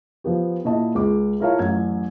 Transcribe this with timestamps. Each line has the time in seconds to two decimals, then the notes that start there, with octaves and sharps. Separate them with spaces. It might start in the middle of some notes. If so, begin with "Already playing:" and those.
0.24 F3 B3 G4
0.65 A#2 E4 D#5 A5
0.95 C#2 D6
1.40 E4 F4 A#4 C#5 F5 A5
1.59 A1 F#2 F#3 G#6